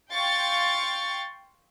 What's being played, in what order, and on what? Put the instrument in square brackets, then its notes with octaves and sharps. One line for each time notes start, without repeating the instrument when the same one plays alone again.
[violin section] F5 G5 C6 C#6 A6